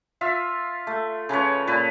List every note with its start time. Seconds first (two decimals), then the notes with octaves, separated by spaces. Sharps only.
0.21 F4 E5 F5
0.87 A3
1.29 C#3 F3 B4 C#5
1.67 A#2 B4 A5